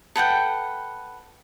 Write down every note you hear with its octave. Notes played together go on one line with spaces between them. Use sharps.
A4 B4 F#5 G5